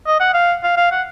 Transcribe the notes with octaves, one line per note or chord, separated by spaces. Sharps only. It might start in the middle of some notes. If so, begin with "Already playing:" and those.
D#5
F#5
F5
F5
F5
F#5